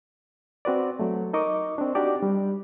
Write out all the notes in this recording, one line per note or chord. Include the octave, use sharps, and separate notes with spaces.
C4 F#4 B4 D5
F#3 A3
D#4 A#4 D#5 C#6 D6
C4 D4
D4 D#4 F#4 G4 D5 D6
G3